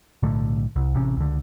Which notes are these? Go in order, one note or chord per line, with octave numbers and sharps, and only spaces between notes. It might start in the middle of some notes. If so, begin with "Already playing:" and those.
B1 A2 D3 A3
C2
A1 C3 C#4
C#2 D3